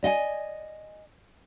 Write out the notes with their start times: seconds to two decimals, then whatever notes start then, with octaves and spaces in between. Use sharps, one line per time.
0.03 D5 D#5 F#5 G#5